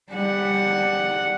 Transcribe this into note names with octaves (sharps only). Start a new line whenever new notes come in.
G3 F#5